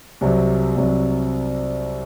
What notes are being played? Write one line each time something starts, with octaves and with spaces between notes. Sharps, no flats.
C2 C3 F#3
C2 C3 F#3